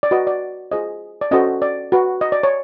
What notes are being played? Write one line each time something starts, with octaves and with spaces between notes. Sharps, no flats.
D5
F#4 B4 D#5
D5
F4 G#4 C5 D#5
D5
C#4 F#4 A4 C5 D#5
D5
F#4 B4
D#5
D5
C#5